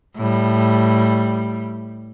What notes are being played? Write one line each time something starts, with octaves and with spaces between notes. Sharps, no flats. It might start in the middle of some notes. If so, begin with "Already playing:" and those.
A2 G3